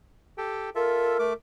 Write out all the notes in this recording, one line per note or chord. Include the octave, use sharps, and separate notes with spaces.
G4 A4 G5
F4 A4 A#4 E5
A3 D6